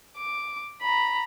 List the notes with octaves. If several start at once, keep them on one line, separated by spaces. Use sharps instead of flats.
D6
A#5 B5